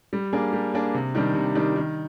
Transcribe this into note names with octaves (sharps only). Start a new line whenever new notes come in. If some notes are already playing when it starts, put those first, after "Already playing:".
G3
A#3 D4 G#4
G3
A#3 D4 G#4
C3
D#3 G3 D4
C3
D#3 G3 D4
D#3